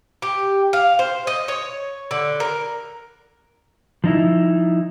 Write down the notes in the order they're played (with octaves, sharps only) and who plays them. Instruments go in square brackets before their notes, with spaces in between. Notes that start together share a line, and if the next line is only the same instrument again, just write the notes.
[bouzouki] G4
F5
C5
D#5
C#5
D3
A#4
[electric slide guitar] F3 D#4 E4